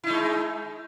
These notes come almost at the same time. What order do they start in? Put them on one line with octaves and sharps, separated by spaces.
E4 D#4 G#3